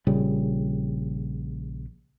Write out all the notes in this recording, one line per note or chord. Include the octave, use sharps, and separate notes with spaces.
A#1 C#3 G3